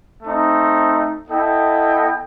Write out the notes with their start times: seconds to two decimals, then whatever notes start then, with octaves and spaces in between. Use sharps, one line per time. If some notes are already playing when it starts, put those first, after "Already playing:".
0.23 A3 C4 D#4
1.29 B3 E4 A4 D#5 G5